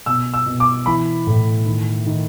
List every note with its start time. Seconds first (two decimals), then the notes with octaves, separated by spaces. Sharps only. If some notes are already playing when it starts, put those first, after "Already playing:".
0.06 B2 E6
0.34 E6
0.46 B2
0.60 D6
0.86 E3 B5
1.27 A2
1.66 D#3
2.06 D#3